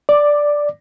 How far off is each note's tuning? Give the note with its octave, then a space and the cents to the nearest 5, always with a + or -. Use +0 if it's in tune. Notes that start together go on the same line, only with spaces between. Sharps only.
D5 +0 D6 +10